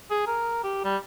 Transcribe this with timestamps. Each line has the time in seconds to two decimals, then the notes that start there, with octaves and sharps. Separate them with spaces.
0.11 G#4
0.27 A#4
0.64 G4
0.84 G3